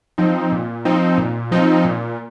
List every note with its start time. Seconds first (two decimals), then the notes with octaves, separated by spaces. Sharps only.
0.18 F3 C4 D#4
0.52 A#2
0.85 F3 C4 D#4
1.18 A#2
1.51 F3 C4 D#4
1.84 A#2